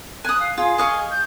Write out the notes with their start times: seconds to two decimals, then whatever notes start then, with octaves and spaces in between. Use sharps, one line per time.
0.25 G#5 D#6 F#6
0.40 F5
0.58 F4 G#4
0.78 D#5 F5 C#6
1.11 G6